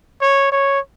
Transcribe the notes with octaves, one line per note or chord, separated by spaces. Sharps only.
C#5
C#5